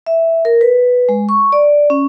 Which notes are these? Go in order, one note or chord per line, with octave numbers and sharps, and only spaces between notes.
E5
A#4
B4
G#3
C#6
D5
C#4